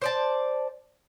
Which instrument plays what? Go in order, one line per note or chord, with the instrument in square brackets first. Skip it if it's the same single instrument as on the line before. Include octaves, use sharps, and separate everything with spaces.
[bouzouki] C5 D5 A5